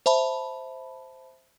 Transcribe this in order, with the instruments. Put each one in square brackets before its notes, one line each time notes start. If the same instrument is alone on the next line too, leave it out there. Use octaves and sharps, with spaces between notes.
[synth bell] C5 E5 A5 B5